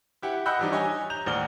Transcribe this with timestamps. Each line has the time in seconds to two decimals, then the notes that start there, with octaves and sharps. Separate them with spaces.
0.22 E4 G4 F#5
0.46 D#5 F#5 B5 E6 F#6 G6
0.59 E3 F3 G3 D4 D#4
0.72 G4 C#5 D#5 G#5
1.10 A#5 G6 F7
1.26 A1 D#2 D5 F#5 F6 G7